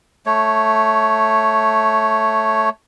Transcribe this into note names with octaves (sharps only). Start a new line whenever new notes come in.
A3 C#5